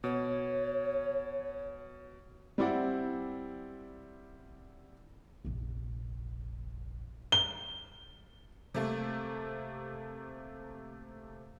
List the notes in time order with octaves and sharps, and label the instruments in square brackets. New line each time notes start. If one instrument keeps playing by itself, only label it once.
[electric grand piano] B2 [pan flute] C#5
[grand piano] G3 C4 E4 D5 F#5
[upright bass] F1 A#1
[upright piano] G7
[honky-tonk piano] C3 A3 A#3